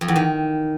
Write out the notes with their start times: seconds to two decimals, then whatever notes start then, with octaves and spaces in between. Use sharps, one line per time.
0.01 F2
0.08 E2
0.16 D#3